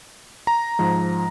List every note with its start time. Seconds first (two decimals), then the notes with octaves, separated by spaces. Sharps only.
0.47 A#5
0.79 G#2 F3